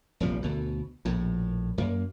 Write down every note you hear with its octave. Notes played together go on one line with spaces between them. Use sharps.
F1 A#1 F3 G3
D2 B2
A#1 A2
F#2 A#3